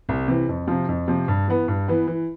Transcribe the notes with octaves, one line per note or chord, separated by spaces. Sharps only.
C2
C3 E3
F2
C3 F3
F2
C3 F3
G2
E3 B3
G2
E3 B3
E3